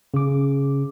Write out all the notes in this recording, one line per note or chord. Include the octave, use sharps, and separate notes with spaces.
C#3 D6